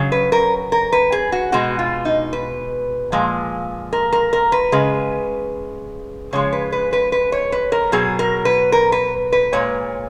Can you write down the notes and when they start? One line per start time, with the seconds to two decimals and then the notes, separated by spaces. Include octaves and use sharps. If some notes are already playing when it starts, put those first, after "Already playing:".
Already playing: C#3 F#3
0.12 B4
0.32 A#4
0.72 A#4
0.92 B4
1.12 G#4
1.32 F#4
1.52 B2 G#3 F#4
1.79 F4
2.05 D#4
2.33 B4
3.12 A#2 F3 G#3
3.93 A#4
4.13 A#4
4.33 A#4
4.52 B4
4.72 C#3 G#3
6.33 C#3 F3 G#3 C#5
6.53 B4
6.72 B4
6.93 B4
7.12 B4
7.32 C#5
7.52 B4
7.72 A#4
7.92 B2 F#3 G#4
8.19 A#4
8.45 B4
8.72 A#4
8.92 B4
9.32 B4
9.53 A#2 G#3 C#5